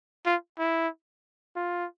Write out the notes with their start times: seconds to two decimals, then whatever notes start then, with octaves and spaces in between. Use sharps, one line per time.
0.26 F4
0.59 E4
1.56 F4